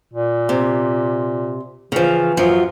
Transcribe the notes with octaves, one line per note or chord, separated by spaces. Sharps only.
A#2
C3
C#3 E3 F3
F#2 F3 F#3